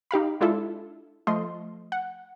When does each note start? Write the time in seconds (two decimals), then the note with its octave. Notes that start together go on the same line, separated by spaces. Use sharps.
0.11 D#4 G4 F5 B5
0.41 G#3 D4 E4 F4 A4 E5
1.27 F3 A3 D#5 C6
1.92 F#5